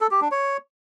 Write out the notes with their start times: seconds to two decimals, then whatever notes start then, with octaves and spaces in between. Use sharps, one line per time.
0.01 A4
0.11 G4
0.21 D4
0.31 C#5